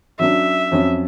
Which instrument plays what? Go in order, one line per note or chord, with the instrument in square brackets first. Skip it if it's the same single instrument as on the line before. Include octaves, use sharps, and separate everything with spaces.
[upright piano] F#3 C#4 D4 [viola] E5
[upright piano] F2 F#3 C#4